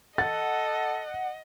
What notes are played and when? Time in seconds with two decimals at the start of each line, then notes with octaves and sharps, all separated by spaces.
0.18 A4 D#5 F#5 A6